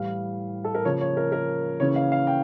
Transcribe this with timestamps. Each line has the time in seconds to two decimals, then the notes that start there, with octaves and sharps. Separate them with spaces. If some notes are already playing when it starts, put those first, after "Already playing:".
Already playing: A2 E3 G3 F5
0.64 A4
0.75 A#4
0.85 C#3 F3 A#3 C#5
1.01 C#5
1.17 A#4
1.32 A#4
1.80 C#3 E3 A#3 C#4 C#5
1.96 F5
2.12 F5
2.27 G5